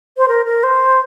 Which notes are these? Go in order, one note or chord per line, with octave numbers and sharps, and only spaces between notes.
C5
A#4
A#4
C5